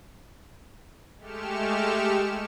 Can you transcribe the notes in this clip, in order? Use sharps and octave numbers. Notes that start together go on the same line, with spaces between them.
G#3 A3 G4 F6 C#7 E7